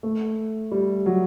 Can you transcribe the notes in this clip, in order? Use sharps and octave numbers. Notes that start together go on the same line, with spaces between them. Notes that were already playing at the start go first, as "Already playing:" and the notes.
A3
G3
F#3